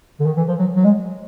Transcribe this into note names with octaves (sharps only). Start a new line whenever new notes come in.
D3
D#3
E3
F3
F#3
F#3
G#3